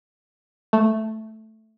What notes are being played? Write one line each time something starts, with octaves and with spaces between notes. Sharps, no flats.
A3